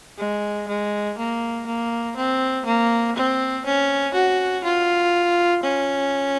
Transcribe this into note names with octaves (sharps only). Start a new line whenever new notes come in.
G#3
G#3
A#3
A#3
C4
A#3
C4
C#4
F#4
F4
C#4